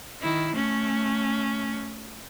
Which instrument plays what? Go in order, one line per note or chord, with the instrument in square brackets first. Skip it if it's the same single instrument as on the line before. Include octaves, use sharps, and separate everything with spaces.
[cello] D#3 E4
A3 C#4